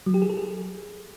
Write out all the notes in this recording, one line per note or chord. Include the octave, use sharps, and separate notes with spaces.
F#3
G4
G#4
A4
G#4